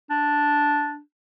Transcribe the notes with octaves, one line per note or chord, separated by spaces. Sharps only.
D4